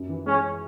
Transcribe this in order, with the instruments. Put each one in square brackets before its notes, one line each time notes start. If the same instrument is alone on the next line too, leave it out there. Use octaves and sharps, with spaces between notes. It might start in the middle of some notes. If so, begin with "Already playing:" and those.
Already playing: [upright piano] F#2
E3
[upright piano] G#3 [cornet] C#4